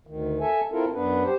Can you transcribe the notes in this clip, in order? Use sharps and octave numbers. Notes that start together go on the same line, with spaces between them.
D2 D#3
A4 E5 G#5
C4 E4 F4 A4 A#4
F#2 B3 D4 B4
G4 C5